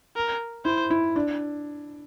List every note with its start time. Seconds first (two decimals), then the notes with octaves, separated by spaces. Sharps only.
0.16 A#4
0.65 E4 C5
0.90 E4
1.16 D4